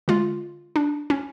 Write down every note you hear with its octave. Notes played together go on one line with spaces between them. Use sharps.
D3 G#3 F4
D4
C#4